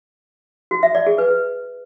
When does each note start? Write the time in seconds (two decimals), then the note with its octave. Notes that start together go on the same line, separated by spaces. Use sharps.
0.71 F#4
0.83 E5
0.95 D5
1.07 G#4
1.18 B4